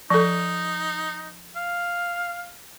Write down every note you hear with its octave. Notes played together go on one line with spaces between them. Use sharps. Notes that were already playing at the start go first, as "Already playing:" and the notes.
F3 D#4 A4
F5